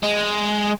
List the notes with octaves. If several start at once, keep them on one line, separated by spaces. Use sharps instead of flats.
G#3